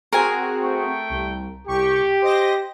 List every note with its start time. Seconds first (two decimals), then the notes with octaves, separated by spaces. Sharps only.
0.13 C4 F#4 G#4 A#4 G#5
0.62 A3 G5 C#6
1.10 C2
1.67 C2 G4 C#6
2.22 C5 D#5 A#6